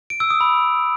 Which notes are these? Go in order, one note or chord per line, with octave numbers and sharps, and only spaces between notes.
D7
E6
D#6
B5